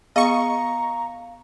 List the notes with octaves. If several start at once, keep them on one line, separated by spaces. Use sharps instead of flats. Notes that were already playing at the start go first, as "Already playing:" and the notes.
B3 G#4 D#5 F5 A#5 C#6